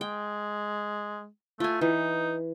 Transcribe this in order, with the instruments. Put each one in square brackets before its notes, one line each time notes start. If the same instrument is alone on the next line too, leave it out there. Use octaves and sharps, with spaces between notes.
[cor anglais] G#3 [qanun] G5
[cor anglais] A3 [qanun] F4 G#5
[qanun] E3 [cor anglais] D#4